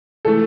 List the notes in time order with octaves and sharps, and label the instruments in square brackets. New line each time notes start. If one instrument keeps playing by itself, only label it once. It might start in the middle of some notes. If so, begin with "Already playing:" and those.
[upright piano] E3 A3 A4